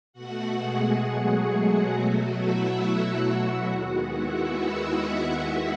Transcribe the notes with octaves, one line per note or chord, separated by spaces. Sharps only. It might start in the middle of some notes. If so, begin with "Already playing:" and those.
B2 A3 F#4 F#5
G#3 G#4
F#3 F#4
G#3 G#4
B2 F#3 A3 F#4
E4 E5
F#4 F#5
D#2 D#3 G#3 B3 F#4 F#5
E4 E5
E4 E5